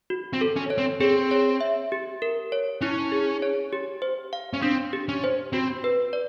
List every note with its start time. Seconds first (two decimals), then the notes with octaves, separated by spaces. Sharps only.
0.10 F#4
0.33 C4
0.41 A4
0.56 C#4
0.70 C#5
0.78 C4
1.00 C4 G#4
1.31 C#5
1.61 E5
1.92 G4
2.22 A#4
2.52 C#5
2.81 C#4 E4
3.12 G#4
3.42 C#5
3.73 G4
4.02 C5
4.33 F5
4.53 C#4
4.62 C4 D4
4.93 G4
5.09 C#4
5.24 C5
5.53 C4 F#4
5.84 B4
6.13 D5